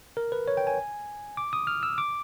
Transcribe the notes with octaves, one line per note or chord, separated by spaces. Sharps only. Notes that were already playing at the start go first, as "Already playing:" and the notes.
A#4
B4
C#5
G5
G#5
D6
D#6
F6
E6
D6